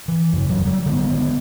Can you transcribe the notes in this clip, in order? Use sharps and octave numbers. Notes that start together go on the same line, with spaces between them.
E3
F#2 C#3
E1 F#3
F#3 G3
D3 D#3 G#3 B3